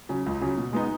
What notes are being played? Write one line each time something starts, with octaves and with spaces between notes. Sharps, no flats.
C#3 F#3
C#2
C#3 F#3
B2
G#3 B3 D#4